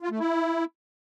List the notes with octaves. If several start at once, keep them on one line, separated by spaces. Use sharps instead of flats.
F4
A3
E4